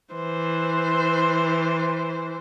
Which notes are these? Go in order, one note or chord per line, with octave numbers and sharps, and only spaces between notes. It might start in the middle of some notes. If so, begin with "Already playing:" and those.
E3 C5